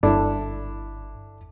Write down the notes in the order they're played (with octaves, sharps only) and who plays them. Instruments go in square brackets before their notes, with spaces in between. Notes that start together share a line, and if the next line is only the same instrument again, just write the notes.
[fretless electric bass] G1 [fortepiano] D4 E4 A4